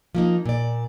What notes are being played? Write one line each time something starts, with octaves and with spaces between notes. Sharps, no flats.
F3 A#3 D#4
A#2 D5